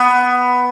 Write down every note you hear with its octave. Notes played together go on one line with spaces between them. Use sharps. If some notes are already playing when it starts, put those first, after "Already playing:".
Already playing: B3